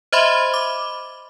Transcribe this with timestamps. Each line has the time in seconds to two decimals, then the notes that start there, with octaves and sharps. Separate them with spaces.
0.13 C5 D#5 E5 B5 C6
0.54 D6